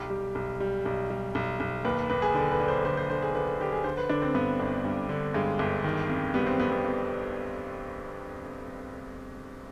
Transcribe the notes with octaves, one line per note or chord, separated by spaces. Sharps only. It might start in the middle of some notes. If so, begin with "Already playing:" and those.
Already playing: B1 G4
G3
B1
G3
B1
G3
B1
B1
D#2 B4
D#2 B4
G#4
D3
B4
D3
C5
D3 C5
C5
D3 C5
G#4
D3 B4
D3 G4
G#4
D3 C5
B4
D3 D4
C4
G2 B3
G1
G2
D3
G2 G#3
G1
D#3
F2
G3 B3
C4
F2 B3
B3
F2